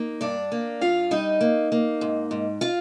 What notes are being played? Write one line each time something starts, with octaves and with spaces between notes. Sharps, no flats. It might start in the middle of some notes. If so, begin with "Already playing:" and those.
Already playing: A#3 D#4
G2 D4 D5
A#3
G2 F4 F5
G3 D#4 D#5
A#3
A#3
G#2
G#2
F4 F5